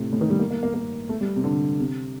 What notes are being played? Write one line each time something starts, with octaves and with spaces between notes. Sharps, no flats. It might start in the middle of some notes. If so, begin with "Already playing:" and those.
Already playing: A2 C3
A2
D#3
G3
A#3
A#3
A#3
A#3
A3
G3
C3
D3
C3